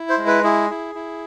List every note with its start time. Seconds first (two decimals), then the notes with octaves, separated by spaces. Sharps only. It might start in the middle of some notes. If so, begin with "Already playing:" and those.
Already playing: E4
0.09 C5
0.18 G#3
0.27 B4
0.44 E4 G#4
0.70 E4
0.95 E4